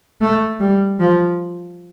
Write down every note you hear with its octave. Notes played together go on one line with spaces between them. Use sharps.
A3
G3
F3